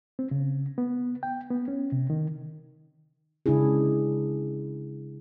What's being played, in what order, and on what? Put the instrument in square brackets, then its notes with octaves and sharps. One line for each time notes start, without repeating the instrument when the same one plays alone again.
[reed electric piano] C4
C#3
B3
G5
B3
C#4
C3
D#3
[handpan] C#3 G#3 D4 E4 G#4